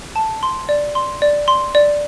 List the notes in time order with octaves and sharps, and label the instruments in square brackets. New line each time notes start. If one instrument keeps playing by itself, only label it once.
[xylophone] A5
C6
D5
C6
D5
C6
D5